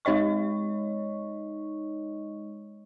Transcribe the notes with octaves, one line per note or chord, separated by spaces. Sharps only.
G#3 D#4 C#5 D#5 C#6